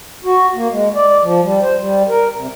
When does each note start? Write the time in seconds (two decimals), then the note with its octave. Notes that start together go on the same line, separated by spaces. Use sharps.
0.24 F#4
0.55 A#3
0.70 G#3
0.95 D5
1.08 D5
1.22 F3
1.41 G3
1.62 C5
1.79 G3
2.09 A#4
2.35 C3